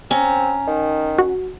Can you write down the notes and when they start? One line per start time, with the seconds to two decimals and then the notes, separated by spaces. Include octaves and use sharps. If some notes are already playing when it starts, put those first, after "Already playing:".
0.11 C4 C#4 A#5
0.67 D#3
1.18 F#4